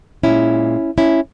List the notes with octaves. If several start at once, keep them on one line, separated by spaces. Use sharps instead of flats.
A#2 G#3 C#4 E4
C#4 E4